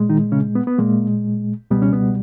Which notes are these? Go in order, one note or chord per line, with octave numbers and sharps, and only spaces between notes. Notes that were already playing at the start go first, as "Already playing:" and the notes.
Already playing: A#2 G#3
D#3 D#4
C#3 C#4
B3
B3
A#2 G#3 A#3
C#2 B2 G3 B3
C#4
B3